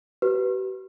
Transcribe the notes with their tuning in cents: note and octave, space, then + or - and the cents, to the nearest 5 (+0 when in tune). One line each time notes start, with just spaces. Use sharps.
G4 -45 B4 +0